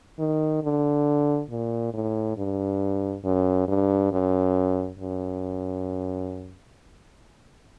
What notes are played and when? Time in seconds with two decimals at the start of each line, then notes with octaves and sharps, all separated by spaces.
0.19 D#3
0.63 D3
1.50 A#2
1.94 A2
2.37 G2
3.25 F#2
3.68 G2
4.12 F#2
4.99 F#2